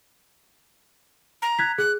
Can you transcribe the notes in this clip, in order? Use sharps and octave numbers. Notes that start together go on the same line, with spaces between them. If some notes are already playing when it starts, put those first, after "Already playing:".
A#5
F#6 G#6 B6
G#4 F#6